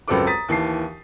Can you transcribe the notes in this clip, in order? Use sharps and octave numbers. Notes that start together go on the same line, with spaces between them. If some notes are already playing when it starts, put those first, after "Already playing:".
C#2 F#2 C4 A4 B4 D6
A#5 D#6 A6 B6
D#2 E3 A5 C7